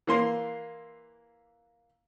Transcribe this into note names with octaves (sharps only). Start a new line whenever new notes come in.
E3 A#3 C6